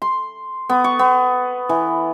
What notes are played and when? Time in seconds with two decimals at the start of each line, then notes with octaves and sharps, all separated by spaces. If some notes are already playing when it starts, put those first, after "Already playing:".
0.02 C6
0.69 B3
0.84 C#6
0.99 B3
1.69 E3